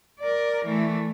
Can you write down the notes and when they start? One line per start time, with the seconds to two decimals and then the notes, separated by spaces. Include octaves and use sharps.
0.20 A#4 D5
0.65 E3 A3